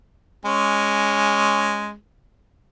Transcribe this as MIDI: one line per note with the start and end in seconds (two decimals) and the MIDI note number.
0.45 1.93 56
0.45 1.93 61